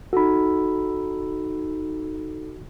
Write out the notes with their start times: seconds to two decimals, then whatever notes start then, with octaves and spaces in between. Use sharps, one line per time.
0.13 D#4 F#4 A4 B5